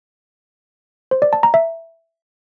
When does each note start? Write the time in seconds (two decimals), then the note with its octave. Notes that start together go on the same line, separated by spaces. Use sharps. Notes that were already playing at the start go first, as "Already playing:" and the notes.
1.11 C5
1.22 D5
1.33 A5
1.43 A#5
1.54 E5